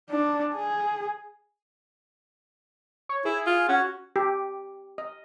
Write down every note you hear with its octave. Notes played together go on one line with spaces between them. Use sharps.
D4
G#4
C#5
E4 G#4
F4
C#4 F#4
G4
D#5